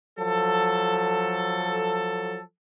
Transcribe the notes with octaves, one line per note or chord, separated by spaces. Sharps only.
F3 F#3 A4